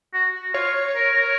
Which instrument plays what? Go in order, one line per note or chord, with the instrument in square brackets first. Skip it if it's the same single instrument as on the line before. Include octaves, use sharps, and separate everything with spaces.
[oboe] F#4
F#4
[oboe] F4 [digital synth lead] C#5
[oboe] A#4
A#4